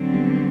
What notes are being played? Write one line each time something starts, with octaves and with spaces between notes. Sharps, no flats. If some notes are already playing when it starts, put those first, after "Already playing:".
Already playing: D3 F#3 C4
G3 B3